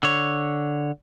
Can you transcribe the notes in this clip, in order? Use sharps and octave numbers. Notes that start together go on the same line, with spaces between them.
D3 C#5